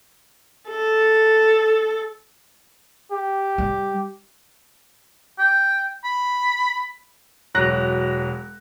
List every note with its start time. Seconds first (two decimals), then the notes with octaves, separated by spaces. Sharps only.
0.69 A4
3.12 G4
3.58 G3
5.39 G5
6.04 B5
7.55 E1 F#3 F#6 A#6